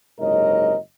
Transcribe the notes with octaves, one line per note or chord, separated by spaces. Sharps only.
F#1 G#2 C3 A#4 C#5 D#5